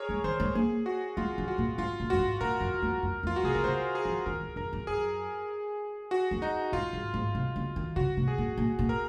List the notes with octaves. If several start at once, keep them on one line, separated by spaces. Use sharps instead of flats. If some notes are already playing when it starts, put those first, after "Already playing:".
Already playing: G#4 A#4 C#5
G#3
D#3 C5
G#3
A#3 G#4
F#4
G#3 F4
F#3
F#4
A#2
G#2 F4
A#2
F#2 F#4
G#2
A#2 A#4
F#2
F2
F#2
F2
F4
F#4
C3 G#4
C3 A#4
C#3 C5
G#4
F3
D#3 A#4
F#2
F#2 A#4
F#2
F#2 G#4
F#4
F#2
D#4
G#2 F4
G#2
G#2
C3
C#3
D#3
C#3 F#4
C3
G#4
A#2
A#2
A#2
A#4